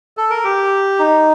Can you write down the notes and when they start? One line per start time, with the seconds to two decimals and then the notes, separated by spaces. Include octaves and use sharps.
0.17 A4
0.30 A#4
0.44 G4
0.99 D#4